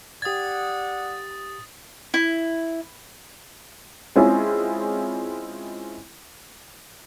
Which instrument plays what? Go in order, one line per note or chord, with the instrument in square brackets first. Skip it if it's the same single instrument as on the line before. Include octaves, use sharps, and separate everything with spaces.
[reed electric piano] G4 G#6 [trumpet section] D5 F#5 [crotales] D#6 A6
[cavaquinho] E4
[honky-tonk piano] G#3 C4 C#4 E4 F4 G#4